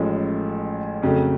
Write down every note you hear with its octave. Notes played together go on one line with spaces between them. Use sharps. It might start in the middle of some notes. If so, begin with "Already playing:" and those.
Already playing: A1 A2 F3 G#3 C#4
F2 C#3 F#3 A3